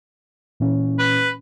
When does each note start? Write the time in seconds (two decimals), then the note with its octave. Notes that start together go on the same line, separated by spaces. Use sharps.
0.60 A#2 E3 C#4
0.99 B4